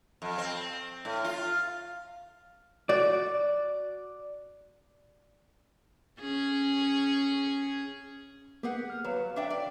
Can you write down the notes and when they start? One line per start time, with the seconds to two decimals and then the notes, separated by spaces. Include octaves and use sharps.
0.22 F2
0.38 C4
1.05 A2
1.24 F4
2.89 F#4 D5
6.20 C#4 G#4
8.63 A#3 B3 G4 G#4 F#5
8.90 F6
9.05 F#3 B4 C#5 F5
9.36 D4 E5 G5
9.50 D5